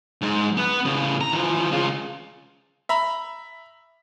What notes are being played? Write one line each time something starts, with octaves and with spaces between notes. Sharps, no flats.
G#2
B3 B4
A2 C#3
A#5
E3 F3
C#3 F4
E5 A#5 B5